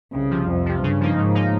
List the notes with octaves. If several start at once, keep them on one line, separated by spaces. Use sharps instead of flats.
C2 C#3
C3 F3
C2 F2
C3 F3
G2 C#3
F3 A#3 D#4
G#2 C#3
F3 A#3 D#4